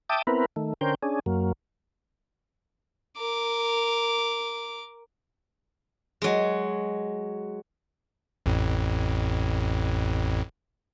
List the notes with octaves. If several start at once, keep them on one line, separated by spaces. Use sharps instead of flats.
E5 G5 A5 D6 D#6
B3 C4 E4 A#4 B4
D#3 A3
D3 C#4 A#4 C5 G5
C#4 D4 G#4
F#2 F#3 A#3
A#4 D6
F#3 G#3
A1 F2 A2